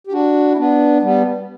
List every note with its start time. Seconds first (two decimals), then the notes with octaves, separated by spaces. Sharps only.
0.07 G4
0.12 D4 F#4
0.52 E4
0.57 B3 D4
1.02 G3 B3